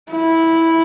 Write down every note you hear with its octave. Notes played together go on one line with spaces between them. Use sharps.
E4